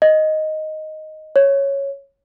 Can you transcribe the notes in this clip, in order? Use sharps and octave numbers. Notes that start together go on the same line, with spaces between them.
D#5
C#5